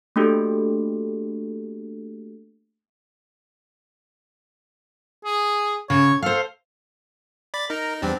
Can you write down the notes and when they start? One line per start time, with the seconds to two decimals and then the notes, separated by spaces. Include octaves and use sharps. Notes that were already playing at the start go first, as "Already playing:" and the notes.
0.16 A3 A#3 D4 F#4 G4 A4
5.25 G#4
5.90 C#3 C#5
6.22 A4 C5 F5
7.54 D5 B5 A6
7.70 D#4 A#4 A#5
8.02 E2 G3 C4 D4